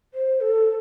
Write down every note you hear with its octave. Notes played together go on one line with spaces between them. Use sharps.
C5
A4